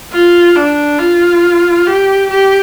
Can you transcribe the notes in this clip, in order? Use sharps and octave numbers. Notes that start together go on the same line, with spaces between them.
F4
D4
F4
G4
G4